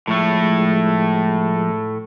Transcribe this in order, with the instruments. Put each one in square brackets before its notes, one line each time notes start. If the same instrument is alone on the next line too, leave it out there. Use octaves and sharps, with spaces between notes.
[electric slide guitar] A2 A3 [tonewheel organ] F3 G#3